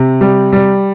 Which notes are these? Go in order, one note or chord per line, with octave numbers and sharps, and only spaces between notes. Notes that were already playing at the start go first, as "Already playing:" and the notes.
Already playing: C3
G3
G3